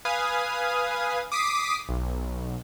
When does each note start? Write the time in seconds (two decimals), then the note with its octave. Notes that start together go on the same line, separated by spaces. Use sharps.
0.05 B4 F5 G#5 D#6
1.32 D6 D#6 B6 C7
1.89 B1